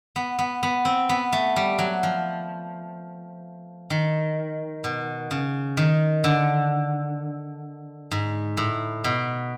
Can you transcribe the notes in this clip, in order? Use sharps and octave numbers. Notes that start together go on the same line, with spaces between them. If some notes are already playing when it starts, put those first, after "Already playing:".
B3
B3
B3
C4
B3
A3
G3
F#3
F3
D#3
B2
C#3
D#3
D3
G#2
A2
B2